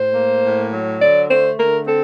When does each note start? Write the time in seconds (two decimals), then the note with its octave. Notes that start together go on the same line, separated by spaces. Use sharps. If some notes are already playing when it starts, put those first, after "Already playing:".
Already playing: A2 C5
0.14 A#3
0.43 A2
0.71 F#3
1.00 D3 D5
1.28 A3 C5
1.57 D3 A#4
1.86 C4 A4